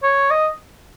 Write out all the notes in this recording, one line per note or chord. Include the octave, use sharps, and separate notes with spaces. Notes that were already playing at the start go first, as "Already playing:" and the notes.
C#5
D#5